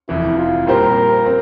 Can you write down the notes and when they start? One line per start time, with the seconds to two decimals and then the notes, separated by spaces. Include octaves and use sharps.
0.09 F1 F2 E3 E4
0.38 F4
0.67 A#2 G3 C4 G4 A#4 C5
1.26 C4